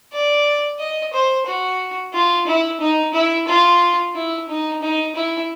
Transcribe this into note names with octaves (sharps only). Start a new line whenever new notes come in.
D5
D#5
C5
F#4
F4
E4
D#4
E4
F4
E4
D#4
D#4
E4